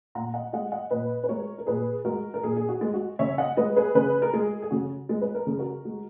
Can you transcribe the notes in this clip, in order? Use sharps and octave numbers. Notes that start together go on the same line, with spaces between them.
A#2 F#5 A#5
D#5 F#5
G#3 D#5 F#5
D#5 F#5
A#2 B4 D#5
B4
G#3 A#4 C#5
A#4
A#2 G#4 B4
G#3 F#4 A#4
A#4
A#2 G#4
G#4
F#4
G#3
F#4
C#3 C#5 E5
D#5 F#5
G#3 B4 D#5
G#4 B4
C#3 G#4 B4
A#4
G#3 G#4
G#4
C#3 F#4
G#3
B4
A#4
C#3 G#4
F#4 A#4
G#3